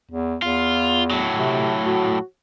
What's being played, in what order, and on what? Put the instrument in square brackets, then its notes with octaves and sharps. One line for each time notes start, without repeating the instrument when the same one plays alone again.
[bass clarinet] E2
[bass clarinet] E2 [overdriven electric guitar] F4
[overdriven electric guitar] A2 F#3
[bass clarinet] C3
F#4